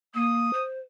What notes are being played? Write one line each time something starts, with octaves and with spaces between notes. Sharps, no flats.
A#3 D#6
C5